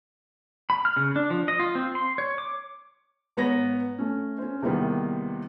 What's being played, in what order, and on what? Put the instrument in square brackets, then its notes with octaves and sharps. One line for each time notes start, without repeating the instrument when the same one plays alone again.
[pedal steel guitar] B5
F6
C#3
D4
F3
D#5
F4
C4
C6
C#5
D6
[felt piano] G#1 B3 C#5 A#6
A3 C#4
C#4 C5
E2 C3 D#3 G3 A#3 B3